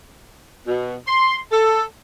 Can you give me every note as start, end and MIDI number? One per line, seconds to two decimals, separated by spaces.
0.67 0.95 47
1.07 1.37 84
1.52 1.82 69